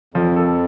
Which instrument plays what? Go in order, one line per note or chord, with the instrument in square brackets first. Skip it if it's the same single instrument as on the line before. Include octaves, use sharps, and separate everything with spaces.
[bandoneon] F2 [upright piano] F3
[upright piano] A4